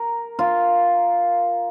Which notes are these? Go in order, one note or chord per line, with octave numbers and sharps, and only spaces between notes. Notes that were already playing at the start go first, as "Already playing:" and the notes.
Already playing: A#4
F4